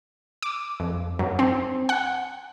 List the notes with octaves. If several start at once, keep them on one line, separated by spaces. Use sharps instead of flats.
D6
F2
F#2
C4
F#5